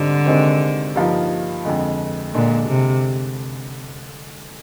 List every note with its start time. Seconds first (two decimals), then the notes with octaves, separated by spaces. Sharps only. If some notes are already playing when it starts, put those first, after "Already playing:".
Already playing: G#2 D3 G3 C4 D#4
0.26 C3 D#3 G#3 C4
0.96 G2 F3 A#3 D#4
1.65 F2 D3 G#3
2.34 A#2 D3 G#3 D4
2.69 C3